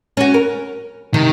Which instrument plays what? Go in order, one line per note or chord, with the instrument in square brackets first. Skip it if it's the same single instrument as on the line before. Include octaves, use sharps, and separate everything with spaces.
[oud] C#4 F#4
A#4
[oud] C3 [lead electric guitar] D#3